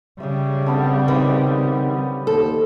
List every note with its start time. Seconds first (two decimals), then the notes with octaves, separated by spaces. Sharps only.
0.20 C#3 G3 G#4 C#5 E5
0.66 D3 B3 C4 A4
1.08 D#3 B3 G4 C5
2.27 D#2 A4 C5